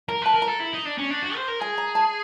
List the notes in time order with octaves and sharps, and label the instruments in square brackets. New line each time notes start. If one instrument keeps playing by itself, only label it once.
[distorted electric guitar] A#4 [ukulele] A#5
[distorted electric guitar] B4 [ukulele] A5
[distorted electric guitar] A#4
[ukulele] A#5
[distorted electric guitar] A4
E4
D#4
D4
C#4
D4
F#4
C5
A#4
[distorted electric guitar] G#4 [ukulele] G#5
[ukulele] A#5
A5